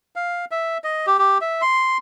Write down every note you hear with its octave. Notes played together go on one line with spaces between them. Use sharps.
F5
E5
D#5
G4
G4
E5
C6